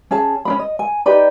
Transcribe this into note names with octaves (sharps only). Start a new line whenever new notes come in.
C#4 G#4 A5
C#4 D4 B5
D#5
G#5
D#4 G4 B4 D5